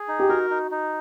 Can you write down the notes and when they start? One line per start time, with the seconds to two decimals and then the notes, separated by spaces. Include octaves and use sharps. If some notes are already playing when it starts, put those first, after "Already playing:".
Already playing: G#4
0.08 D#4
0.19 G4
0.29 F#4 A#4
0.50 D#4
0.71 D#4